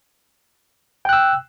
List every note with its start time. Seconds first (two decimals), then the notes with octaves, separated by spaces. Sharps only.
1.05 G5
1.09 F#6
1.13 E6